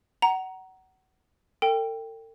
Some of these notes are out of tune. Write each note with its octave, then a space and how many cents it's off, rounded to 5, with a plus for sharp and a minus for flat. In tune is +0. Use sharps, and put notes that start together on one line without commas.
F#5 +25 A#5 +5
A4 +45 G5 +5